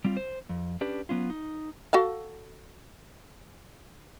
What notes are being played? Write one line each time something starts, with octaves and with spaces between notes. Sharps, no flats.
G3 C4 F4
C5
F2
C#4 D4 G4 B4
F#3 B3 C#4 F4
D#4
F#4 A4 F5